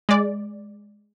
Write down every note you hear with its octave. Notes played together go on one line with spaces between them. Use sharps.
G#3 D5